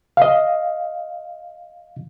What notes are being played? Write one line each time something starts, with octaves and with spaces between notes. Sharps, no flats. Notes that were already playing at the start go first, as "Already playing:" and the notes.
D#5 F5